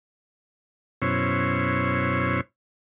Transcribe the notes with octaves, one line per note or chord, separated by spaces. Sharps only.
F#2 B2 C#4 E4 C5 C#5